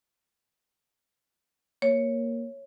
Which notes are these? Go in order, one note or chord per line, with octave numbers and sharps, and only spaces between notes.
A#3 C#5